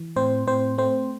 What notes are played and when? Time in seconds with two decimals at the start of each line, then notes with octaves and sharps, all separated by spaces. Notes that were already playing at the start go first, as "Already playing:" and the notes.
Already playing: E3
0.16 A2 C4 C5
0.47 A2 C4 C5
0.78 A3 C4 C5